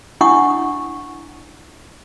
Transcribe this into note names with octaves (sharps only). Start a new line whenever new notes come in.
D4 E4 F#5 C#6 D#6